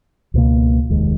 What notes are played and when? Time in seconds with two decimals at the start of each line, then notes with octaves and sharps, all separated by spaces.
0.34 C#2 B2 A#3
0.89 F1 D#2 D#3 G#3